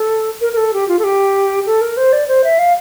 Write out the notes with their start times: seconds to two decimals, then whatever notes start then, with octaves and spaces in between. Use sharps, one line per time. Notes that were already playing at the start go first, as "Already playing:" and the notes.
Already playing: A4
0.41 A#4
0.53 A#4
0.57 A4
0.74 G4
0.88 F4
0.99 A4
1.04 G4
1.66 A4
1.81 A#4
1.97 C5
2.13 D5
2.28 C5
2.44 E5
2.59 F5